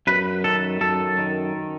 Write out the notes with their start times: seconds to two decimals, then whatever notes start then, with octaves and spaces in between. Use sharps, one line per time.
0.07 F#2 B4
0.44 D#3 A4
0.81 F#2 A4
1.18 D#3